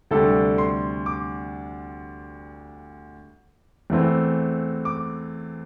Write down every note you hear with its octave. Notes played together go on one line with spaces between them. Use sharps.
D2 C3 G3 D4 A4
C6
D6
E2 E3 A3 C4
D6